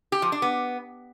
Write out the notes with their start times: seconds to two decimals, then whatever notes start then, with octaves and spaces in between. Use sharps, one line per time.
0.12 G4
0.22 F3
0.32 D4
0.42 B3